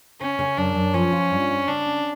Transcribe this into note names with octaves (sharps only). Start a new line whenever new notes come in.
C#3 C#4
C#3
F#2 D4
F#2
F3 C#4
F4
G2
C4
C#3 D4
C#4